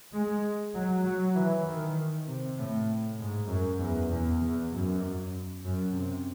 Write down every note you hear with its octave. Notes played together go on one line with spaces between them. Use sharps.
G#3
F#3
F#3
E3
D#3
C3
A2
G#2
F#2
E2
E2
E2
F#2
F#2
C3